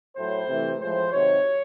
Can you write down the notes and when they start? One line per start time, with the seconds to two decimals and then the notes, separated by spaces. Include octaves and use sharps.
0.16 A2 F#3 A3 C5
0.48 C3 E3 A3
0.80 A2 F3 G#3 C5
1.12 C3 D#3 F#3 C#5